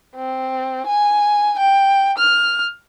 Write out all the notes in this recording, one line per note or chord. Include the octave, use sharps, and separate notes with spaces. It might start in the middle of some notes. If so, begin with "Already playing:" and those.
C4
G#5
G5
F6